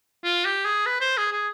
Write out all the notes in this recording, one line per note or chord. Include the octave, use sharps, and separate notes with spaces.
F4
G4
G#4
B4
C5
G#4
G#4